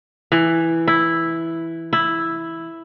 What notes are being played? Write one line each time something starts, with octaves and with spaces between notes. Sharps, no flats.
E3
E4
E4